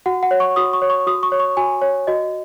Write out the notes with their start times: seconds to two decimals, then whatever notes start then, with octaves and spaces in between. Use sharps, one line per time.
0.06 F#4 F#5
0.23 F#5
0.31 C#5
0.40 C#6
0.56 F#4 D#6
0.73 C#6
0.82 C#5
0.90 C#6
1.07 F#4 D#6
1.23 C#6
1.32 C#5
1.40 C#6
1.57 F#4 G#5
1.81 C#5
2.07 F#4 D#5